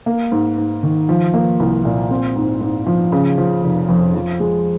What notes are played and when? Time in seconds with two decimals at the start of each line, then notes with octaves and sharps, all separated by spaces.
0.06 A#3
0.32 G#2
0.58 G#2
0.83 D#3
1.09 F3
1.34 A#3
1.60 C2
1.85 A#2
2.11 C4
2.36 G#2
2.61 G#2
2.87 F3
3.12 C#3
3.38 F3
3.64 F1
3.89 F2
4.14 F3
4.40 G#3